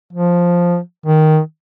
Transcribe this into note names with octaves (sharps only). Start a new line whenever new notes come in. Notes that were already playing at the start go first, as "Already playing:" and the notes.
F3
D#3